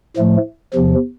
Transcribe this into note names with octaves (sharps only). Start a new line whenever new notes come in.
A2 F3 A3
E2 C3 F3